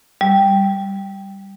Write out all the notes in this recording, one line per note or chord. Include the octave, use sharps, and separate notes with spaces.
G3